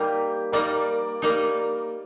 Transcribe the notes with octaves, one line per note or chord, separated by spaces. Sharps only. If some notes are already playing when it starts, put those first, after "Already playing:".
Already playing: G3 A#3 D#4 G4
G3 A#3 D#4 A#4 D5
G3 A#3 D#4